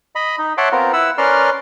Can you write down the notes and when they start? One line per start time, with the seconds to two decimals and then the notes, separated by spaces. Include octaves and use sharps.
0.15 D#5 B5
0.38 D#4
0.58 C#5 E5 F#5 A5 C6 D6
0.72 B3 C4 F4 A#4
0.93 E4 B4 F#5 E6
1.18 C#4 A#4 B4 D5 C6 F6